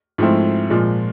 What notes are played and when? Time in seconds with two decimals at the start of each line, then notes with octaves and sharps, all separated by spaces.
0.18 G#2 F3 A3 C4 E4
0.70 A#2 F3 G#3